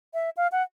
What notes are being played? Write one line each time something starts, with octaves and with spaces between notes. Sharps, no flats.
E5
F5
F#5